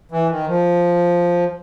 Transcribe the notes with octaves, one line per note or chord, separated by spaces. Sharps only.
E3
D#3
F3